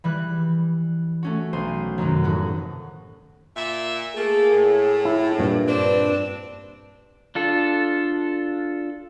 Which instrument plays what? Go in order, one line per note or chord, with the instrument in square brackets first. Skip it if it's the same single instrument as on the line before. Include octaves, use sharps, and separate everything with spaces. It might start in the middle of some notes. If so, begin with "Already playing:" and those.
[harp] E3 G3 F#6
A3 C#4 F#4
B1 C5 D#7
F#2 C3 D#3 F#3
F1 A2 F#4 F#6
[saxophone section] A#2 E5
[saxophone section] A3 A#3 [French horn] G#4
[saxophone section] A2
[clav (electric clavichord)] E4
G2 A#2
[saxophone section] C4 D4 [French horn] B4
[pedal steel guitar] D4 F4 A4